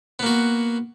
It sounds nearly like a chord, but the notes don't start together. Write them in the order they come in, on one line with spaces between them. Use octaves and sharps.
B3 A#3 F#4